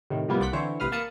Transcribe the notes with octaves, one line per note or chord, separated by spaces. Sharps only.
A2 C3 D#3
A2 C3 F3 G3 A#3 B3
C2 C4 D5 F#5 G6 B6
D3 E3 C4 E4 C5 C#5
A1 C3 B4 F5 D#6 F6
A#3 F5 A5 B5 D#6 C#7